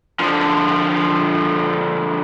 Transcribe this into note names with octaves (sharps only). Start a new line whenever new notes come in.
D3 F3